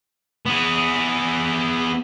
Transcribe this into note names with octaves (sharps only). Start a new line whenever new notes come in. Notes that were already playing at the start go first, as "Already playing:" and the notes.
B3 G#4